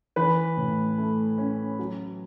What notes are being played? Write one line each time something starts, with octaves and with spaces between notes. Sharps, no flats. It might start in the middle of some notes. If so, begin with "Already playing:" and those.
E3 B4 B5
A2
A3
C#4
F#3